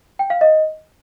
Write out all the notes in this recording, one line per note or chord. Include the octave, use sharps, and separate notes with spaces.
G5
F5
D#5